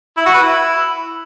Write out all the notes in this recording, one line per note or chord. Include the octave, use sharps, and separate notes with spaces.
E4
F#4
B4
E4